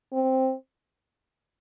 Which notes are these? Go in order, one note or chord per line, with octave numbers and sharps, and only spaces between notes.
C4